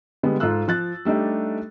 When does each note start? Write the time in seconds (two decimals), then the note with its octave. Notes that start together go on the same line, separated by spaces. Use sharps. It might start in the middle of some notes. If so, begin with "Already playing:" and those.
0.23 D3 G3 G#3 B3
0.40 G#2 F4 A4 E6 F#6
0.68 F3 F#6 A6
1.05 G3 A3 D4 D#4 G4